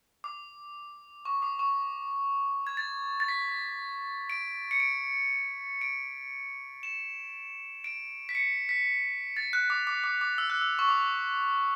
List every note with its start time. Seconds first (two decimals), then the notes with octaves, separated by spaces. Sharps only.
0.24 D6
1.25 C#6
1.42 D6
1.59 C#6
2.67 G#6
2.77 A6
3.20 A6
3.28 B6
4.30 D7
4.71 C#7
4.80 D7
5.81 D7
6.83 E7
7.84 D7
8.29 B6
8.35 C#7
8.69 B6
9.37 A6
9.53 F#6
9.70 D6
9.87 D6
10.04 D6
10.21 D6
10.38 E6
10.50 F#6
10.61 E6
10.79 C#6
10.89 D6